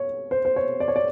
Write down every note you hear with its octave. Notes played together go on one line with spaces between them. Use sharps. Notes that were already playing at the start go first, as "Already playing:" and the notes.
Already playing: C#5
C5
C5
C#5
D5
C#5
D5